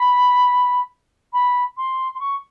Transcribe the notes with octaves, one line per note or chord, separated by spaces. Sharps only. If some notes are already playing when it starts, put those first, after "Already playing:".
Already playing: B5
B5
C6
C6
C#6